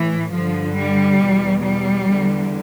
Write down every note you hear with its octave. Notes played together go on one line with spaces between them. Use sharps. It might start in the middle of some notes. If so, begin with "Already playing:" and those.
Already playing: A2 E3
G2 D3 F3
G3
E2 B2
G3
E2 D3